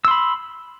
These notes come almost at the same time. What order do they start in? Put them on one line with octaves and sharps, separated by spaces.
E6 C6 B5